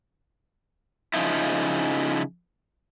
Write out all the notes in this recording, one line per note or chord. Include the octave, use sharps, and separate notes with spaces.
C#3 F3 A#3 D#4 E4